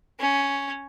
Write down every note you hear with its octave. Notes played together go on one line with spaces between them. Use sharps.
C#4